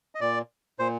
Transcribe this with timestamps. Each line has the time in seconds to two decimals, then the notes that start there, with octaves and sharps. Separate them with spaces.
0.15 D#5
0.21 A#2 D5
0.79 A#2 C5